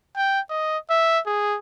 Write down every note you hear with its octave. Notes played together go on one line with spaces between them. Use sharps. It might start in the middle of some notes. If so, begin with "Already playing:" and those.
G5
D#5
E5
G#4